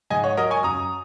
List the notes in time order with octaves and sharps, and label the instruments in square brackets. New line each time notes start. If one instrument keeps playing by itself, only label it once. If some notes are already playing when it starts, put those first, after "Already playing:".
[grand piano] G#2 D#5 G#5
C#5 F#5
F#3 A#4 D#5
G#5 C#6
F#2 A#5 D#6